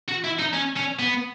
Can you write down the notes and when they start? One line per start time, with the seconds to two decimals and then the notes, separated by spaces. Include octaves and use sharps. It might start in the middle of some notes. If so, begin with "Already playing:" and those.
0.09 F#4
0.25 E4
0.39 D#4
0.54 C#4
0.77 C#4
0.99 B3